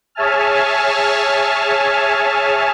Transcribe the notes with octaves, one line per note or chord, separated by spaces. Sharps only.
G#4 C#5 E5 G#5 A5 F6